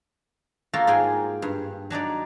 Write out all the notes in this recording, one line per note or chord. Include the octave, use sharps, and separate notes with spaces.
A#3 F4 F#4 A4
G#2 G#4 G5 G#5
G2
F#3 D4 D#4 D5